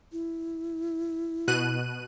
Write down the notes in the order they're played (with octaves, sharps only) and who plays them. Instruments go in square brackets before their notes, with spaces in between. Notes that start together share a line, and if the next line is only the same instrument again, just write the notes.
[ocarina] E4
[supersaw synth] B2 F#6 D#7